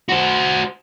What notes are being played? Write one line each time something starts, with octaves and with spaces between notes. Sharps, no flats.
F#4 C5